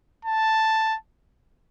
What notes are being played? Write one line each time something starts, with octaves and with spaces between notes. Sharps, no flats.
A5